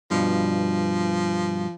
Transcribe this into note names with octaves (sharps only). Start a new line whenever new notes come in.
G2 B2 F3